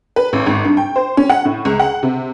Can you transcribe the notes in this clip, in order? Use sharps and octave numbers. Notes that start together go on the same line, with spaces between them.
B4
A1
G#1
G2
G5
C5
C#4
F#5
A2
C#2
F#5
C3